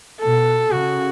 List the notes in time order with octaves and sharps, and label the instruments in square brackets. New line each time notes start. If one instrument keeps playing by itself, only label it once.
[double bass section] B2 [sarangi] A4
[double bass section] C#3 [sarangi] F#4